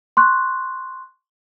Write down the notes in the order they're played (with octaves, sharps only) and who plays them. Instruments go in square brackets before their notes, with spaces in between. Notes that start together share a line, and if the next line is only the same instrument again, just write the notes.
[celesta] C6 C#6 F#6